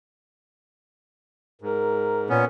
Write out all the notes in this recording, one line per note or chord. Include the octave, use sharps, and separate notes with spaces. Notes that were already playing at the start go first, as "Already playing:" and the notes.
G#2 A#4
A#2 B3 C#4